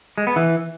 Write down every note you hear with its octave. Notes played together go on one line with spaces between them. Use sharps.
G#3
B3
E3